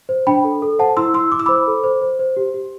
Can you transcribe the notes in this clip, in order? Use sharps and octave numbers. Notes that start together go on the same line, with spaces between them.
C5
D4 G5 B5
A4
A4
C5 F#5 A5
E4 C6 E6
E4 C6 E6
E4 D6
E6
C5 B5 D6
A4
C5
C5
C5
G4
G4